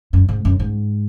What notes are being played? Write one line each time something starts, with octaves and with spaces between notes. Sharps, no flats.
F#2
G#2
F#2
G#2